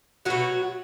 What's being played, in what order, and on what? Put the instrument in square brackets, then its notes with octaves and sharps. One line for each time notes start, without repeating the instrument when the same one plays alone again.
[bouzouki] B2 F#3 A3 F#4